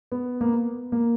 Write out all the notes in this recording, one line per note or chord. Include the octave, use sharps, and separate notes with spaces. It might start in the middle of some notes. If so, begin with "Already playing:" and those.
B3
A#3
B3
A#3